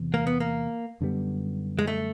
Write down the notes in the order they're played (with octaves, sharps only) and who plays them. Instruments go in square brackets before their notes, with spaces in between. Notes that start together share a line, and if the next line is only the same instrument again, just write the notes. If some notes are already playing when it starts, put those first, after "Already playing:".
Already playing: [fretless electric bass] E2 C3 E3
[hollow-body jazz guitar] A#3
B3
A#3
[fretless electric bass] F#2 D3 G3 B3
[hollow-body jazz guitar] G#3
A3